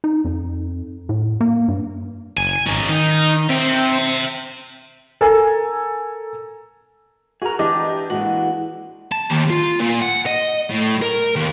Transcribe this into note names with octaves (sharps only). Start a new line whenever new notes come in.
D#4
F2
A2
A#3
G2
F#1 G#5
G#1 C#4 D#4
D#3 D#4
C4 E5 G5
A4 A#4 G#5
F#4 G#4 A#4 A#5
E3 D4 G4 D#5 D6
E3 G#3 A#3 F#4 F#5
A5
D#2
F4
A#2
F#5
D#5
A2
A#4
D#2